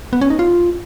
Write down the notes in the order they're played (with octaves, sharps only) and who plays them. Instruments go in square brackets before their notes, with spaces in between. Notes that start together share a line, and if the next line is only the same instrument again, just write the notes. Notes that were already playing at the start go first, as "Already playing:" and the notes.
[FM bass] B3
C#4
D#4
F4